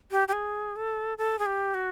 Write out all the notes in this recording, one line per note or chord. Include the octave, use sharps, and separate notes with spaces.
G4
G4
G#4
A4
A4
G#4
G4
F#4